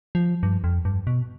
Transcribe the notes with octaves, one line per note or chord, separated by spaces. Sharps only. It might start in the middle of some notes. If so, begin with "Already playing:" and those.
F3
G2
F2
G2
B2